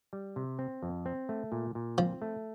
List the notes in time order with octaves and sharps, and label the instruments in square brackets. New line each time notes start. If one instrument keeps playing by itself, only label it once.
[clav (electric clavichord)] G3
C3
C4
F2
C4
A3
A#2
A#2
[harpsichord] F3 [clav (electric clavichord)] C4
[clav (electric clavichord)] A3